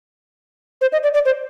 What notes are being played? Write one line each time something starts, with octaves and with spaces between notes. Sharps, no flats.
C5
D#5
D5
D5
C5